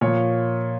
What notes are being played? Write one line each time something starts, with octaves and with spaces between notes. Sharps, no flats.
A#2 F3 C#5